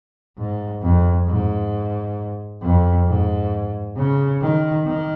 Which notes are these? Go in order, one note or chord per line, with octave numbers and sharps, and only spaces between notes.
G#2
F2
G#2
F2
G#2
C#3
D#3
D#3